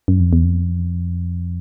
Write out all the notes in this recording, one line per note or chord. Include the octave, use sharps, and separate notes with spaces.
F#2
F2
E2
F2